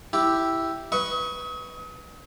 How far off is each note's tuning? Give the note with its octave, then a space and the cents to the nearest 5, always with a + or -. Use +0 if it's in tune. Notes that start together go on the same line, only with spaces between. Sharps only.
E4 +0 G4 +0
B4 +0 D#5 +40 C#6 +0